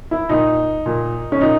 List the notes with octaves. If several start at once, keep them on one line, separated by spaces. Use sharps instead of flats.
E4
A#2 D#4
A#2
C#4
A#2 D#4